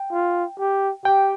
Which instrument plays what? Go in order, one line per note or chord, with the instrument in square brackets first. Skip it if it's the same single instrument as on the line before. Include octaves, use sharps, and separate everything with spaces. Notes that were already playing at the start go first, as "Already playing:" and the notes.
Already playing: [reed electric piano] G5
[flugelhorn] F4
G4
[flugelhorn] G4 [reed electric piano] G5